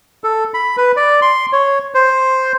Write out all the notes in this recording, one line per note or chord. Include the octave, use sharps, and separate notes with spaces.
A4
B5
B4
D5
C6
C#5
C5